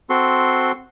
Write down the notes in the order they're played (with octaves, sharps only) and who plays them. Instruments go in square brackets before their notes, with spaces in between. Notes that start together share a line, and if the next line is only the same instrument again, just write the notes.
[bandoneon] C4 F#4 A4 C6